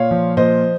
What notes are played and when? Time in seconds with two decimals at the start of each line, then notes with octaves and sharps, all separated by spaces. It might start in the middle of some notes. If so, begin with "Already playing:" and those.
Already playing: A#2 C#5 F5
0.11 F3
0.37 A#2 C5 D#5